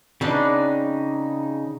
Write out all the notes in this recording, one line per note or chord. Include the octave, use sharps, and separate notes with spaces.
C#3 C4 D4 D#4 B4